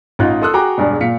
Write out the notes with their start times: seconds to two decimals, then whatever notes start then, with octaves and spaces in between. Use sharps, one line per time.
0.19 A1 D#4 F4 F#6
0.42 A4 C6 D#6 E6 F#6
0.53 F#4 G#4 G5 A#5 D6
0.78 E1 G2 G#4 D5
1.01 A#2 F5 B6 C#7